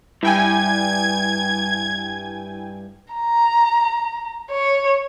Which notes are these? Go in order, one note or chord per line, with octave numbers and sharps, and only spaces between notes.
G2 E4 G5 G#5 G#6
A#5
C#5